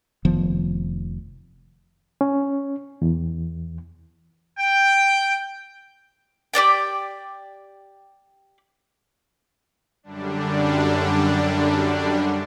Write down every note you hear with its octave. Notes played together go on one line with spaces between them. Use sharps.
F1 D#3 F3 B3
C#4
E2
G5
G4 C5 D5 G5
F#2 D3 G3 D4